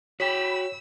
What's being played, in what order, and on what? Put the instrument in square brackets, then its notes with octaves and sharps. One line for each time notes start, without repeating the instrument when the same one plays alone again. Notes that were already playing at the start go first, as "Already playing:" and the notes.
[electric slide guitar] F#4 G5 [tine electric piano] C#5 [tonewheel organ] B5 [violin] E6